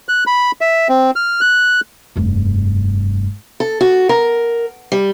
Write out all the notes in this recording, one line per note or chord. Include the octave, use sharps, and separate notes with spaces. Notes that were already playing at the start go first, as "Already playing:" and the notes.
F#6
B5
E5
C4
F6
F#6
F1 G2
A4
F#4
A#4
G3